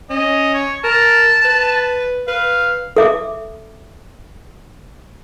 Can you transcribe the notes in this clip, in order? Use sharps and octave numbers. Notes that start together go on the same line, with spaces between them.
C#4 D#5
C#5
A#4 A5
B4
B4 F5
A4 E5 D6